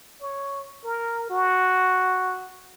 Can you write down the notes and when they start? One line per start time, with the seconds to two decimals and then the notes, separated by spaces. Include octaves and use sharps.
0.22 C#5
0.85 A#4
1.30 F#4